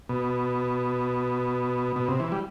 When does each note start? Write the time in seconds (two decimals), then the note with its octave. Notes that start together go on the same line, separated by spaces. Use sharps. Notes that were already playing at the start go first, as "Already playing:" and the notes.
0.09 B2
1.96 B2
2.09 C3
2.20 E3
2.32 G3